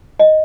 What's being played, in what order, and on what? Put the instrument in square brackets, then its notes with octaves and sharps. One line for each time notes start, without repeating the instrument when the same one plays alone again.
[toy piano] D#5